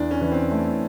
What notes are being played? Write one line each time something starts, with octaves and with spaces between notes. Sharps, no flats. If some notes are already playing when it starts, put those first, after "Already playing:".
Already playing: E2 D4
C#4
E3
C4
A3